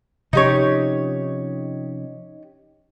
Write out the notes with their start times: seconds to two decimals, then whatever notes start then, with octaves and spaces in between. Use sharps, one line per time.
0.33 C3 F3 C#4 D#4 G4 C#5